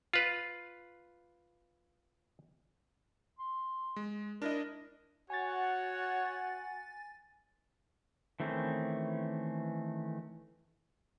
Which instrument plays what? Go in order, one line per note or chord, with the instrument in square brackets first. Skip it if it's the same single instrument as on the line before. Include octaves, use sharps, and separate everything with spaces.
[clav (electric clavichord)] F4 B4
[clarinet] C6
[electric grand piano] G#3
[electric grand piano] D4 E4 D#5 [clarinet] A#4
[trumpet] F#4 [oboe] C#5 [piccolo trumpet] F#5 [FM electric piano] G#5 A6
[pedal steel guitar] D#3 E3 A3 C4 C#4